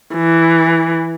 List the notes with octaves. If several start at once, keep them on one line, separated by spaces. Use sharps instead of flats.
E3